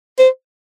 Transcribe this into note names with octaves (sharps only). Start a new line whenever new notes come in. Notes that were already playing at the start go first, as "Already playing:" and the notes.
C5